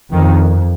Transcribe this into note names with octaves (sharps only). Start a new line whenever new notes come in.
F2 D#3